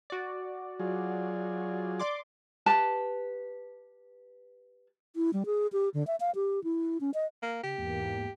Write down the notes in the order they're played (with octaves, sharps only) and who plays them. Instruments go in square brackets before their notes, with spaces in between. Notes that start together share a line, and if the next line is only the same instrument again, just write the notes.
[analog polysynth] F#4 D5
[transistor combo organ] F#3 F4 G#4
[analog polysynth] D5 C6 D6
[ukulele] G4 B4 A5
[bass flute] E4
G3
G#4
G4
D3
E5
F5
G4
E4
C#4
D#5
[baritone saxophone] A#3
[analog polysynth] C#3 [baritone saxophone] G4
[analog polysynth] E2 G#2 A#3